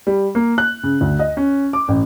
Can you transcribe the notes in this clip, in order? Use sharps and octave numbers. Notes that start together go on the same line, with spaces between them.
G3
A#3
F#6
C#3
D2
D#5
C#4
D6
A1